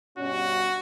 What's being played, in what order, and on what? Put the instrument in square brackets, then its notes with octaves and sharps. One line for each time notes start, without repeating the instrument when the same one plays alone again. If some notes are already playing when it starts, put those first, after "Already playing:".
[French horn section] G2 B2 C#4 [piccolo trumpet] F#4